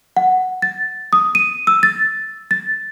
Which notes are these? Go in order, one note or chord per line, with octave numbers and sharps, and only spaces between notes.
F#5
A6
D#6
D#7
E6
A6
A6